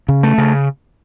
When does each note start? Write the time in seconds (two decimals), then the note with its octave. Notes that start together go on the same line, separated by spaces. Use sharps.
0.08 C#3
0.23 A3
0.38 C#3